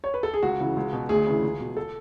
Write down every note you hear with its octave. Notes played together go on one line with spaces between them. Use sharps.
C#5
B4
A4
G#4
C#2 F#4
C#3 E3
C#2
B2
D2 G#4
C#3 E3
C#2
B2
A4